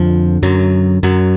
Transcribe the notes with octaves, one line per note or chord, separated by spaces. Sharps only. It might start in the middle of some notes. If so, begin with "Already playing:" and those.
Already playing: F2 D3 F3
F#2 F#3
F#2 F#3